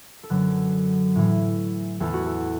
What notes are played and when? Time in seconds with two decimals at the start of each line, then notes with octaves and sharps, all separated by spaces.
0.23 A4
0.30 F#2 D3 F#3 B4
1.15 A2 E3
2.00 E2 E3 A4
2.14 F#4
2.26 A4